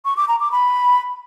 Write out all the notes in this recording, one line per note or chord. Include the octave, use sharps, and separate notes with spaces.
C#6
D6
A#5
D6
B5